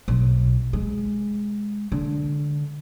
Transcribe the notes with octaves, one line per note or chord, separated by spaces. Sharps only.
B1
G#3
D3